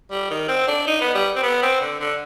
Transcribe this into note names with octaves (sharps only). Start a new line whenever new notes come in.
G3
D#3
C4
D4
D#4
B3
G3
C4
B3
C4
D3
D3